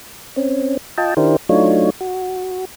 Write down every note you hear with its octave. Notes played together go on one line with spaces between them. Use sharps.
C4 C#4
F4 D#5 G5 A5
D#3 D4 E4 G4 A#4 C5
F#3 A3 D4 D#4 F4 C#5
F#4